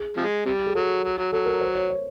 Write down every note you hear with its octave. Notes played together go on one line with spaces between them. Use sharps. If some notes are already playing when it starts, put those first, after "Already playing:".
Already playing: G#4
C3 F3 G#3
C3 G3
G#4
F#3 A4
F#3
F#3
F#3 A4
A#4
C5
C#5
C#5